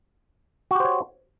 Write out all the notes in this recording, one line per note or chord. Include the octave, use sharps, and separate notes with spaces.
F#4 G4 C5 C#5